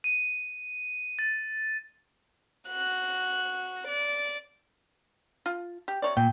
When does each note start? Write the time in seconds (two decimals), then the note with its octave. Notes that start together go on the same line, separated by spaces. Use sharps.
0.04 D#7
1.19 A6
2.69 F#4 F#6
3.88 D5
5.46 F4
5.88 G4
6.02 C3 C#5 D5
6.17 A#2 G5